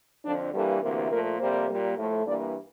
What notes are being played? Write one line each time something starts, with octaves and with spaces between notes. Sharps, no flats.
F2 D3 F3 D4
G2 E3 G3 A#3 A4
D2 C3 E3 A#3 A#4
A#2 F3 A3 A#4
F2 C3 G3 A#3 C5
A#2 G3 A#3
A2 F3 A3
G2 E3 A#3 D5